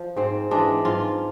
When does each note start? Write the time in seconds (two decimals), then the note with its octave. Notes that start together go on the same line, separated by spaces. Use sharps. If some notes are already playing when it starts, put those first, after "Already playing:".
Already playing: F3
0.16 G#2 C4
0.51 E3 G#3 D4
0.85 G#2 F4